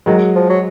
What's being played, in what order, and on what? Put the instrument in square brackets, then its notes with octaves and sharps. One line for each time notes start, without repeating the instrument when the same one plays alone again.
[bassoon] D#3 [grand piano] F#3 G#3
[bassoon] F3
F#3